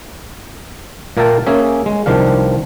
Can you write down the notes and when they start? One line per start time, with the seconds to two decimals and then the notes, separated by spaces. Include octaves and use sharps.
1.17 A#2 A#3 A#4 E5 G5 A5
1.47 A#3 C#4 G#4 E5
1.86 G#3
2.06 C2 D#3 F3 D4 F5